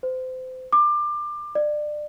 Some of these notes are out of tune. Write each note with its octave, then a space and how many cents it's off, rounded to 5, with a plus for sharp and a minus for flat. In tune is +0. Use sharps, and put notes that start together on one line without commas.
C5 -30
D6 +25
D5 +25